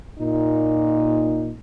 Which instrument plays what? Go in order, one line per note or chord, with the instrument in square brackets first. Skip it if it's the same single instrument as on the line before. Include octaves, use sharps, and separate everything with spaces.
[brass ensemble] A#2 D#4